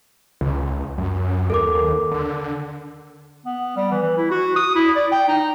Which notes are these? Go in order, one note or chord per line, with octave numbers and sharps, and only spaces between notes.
C#2
F#2
D#2 A4 A#4 D6
D3
B3
G3
E3
E3
E4
F#4
D#6
E4
D5
G5
D#4